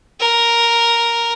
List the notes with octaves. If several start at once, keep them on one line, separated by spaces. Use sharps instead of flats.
A#4